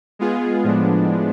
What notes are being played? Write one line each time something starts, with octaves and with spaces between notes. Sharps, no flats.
G#3 B3 F4 G#4
A2 F3 G#3 B3 D4